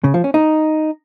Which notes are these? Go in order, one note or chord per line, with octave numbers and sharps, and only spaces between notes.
C#3
F3
C#4
D#4